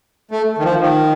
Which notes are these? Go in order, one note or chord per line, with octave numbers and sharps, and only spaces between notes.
A3
D#3
F3
D#3